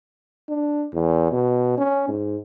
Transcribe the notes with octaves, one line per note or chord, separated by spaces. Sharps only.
D4
E2
B2
C#4
G#2